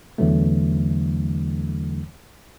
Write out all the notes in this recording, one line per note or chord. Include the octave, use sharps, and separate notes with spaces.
E2 D3 E3 F#3 A3